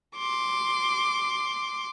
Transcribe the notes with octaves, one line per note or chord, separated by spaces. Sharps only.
C6 D6